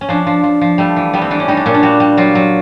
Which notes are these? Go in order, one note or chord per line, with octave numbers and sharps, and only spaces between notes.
C#4
F3 D4
F3
F3
F3
G3 A3
E3
G3 B3
C4
E3 D4
C#4
G3 D#4
D4
A#2 C#4
D4
G3 F#4
G3
F#3 F4
F#3